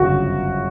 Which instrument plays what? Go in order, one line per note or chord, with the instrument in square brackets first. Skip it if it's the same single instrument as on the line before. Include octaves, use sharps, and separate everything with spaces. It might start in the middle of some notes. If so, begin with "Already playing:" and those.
Already playing: [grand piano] G1 F#2 C#3 F#3 F#4